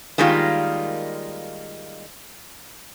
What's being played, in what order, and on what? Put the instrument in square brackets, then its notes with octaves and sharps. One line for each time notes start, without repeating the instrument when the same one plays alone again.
[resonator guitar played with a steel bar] D#3 G3 G#3 A#3 D#4 F4